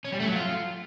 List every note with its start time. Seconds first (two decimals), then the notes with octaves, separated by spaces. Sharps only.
0.05 C#4
0.12 G3
0.20 A3
0.28 F#3
0.35 F4